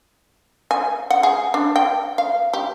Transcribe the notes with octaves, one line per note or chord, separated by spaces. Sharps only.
G#5
F#5
G#4
D4
G5
F5
G4